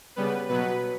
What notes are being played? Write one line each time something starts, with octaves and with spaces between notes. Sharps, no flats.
C#3 G3 B3 B4
B2 F#3 B3 B4